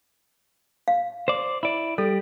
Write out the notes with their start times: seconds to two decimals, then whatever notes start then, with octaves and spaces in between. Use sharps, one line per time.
0.88 F5
1.28 C5 D5
1.63 E4 D5
1.98 G3 A4